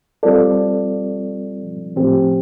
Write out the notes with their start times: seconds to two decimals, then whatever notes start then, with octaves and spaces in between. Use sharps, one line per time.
0.23 G3 C4 F4 A4 D5
1.96 A2 F3 C4 G4